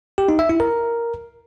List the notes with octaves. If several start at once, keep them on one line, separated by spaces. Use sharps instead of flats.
G4
D#4
E5
E4
A#4